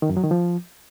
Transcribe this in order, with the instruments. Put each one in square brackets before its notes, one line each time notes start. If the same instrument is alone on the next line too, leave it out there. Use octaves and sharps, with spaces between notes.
[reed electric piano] D#3
F#2
F#3
D#3
F3